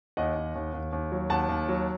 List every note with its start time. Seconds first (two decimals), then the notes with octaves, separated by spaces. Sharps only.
0.17 D#2 D#5 F#5
0.36 D#2
0.55 D#2
0.73 D#2
0.93 D#2
1.12 F#3
1.30 D#2 F#5 A5
1.49 D#2
1.69 F#3